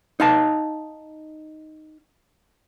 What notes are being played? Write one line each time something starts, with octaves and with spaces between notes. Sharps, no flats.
D#4 F5 A5